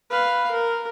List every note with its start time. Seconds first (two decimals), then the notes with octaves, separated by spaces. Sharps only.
0.10 B4 F5
0.52 A#4